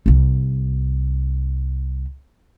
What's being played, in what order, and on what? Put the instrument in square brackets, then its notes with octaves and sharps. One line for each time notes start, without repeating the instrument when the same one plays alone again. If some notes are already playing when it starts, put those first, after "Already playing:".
[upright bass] C2 G3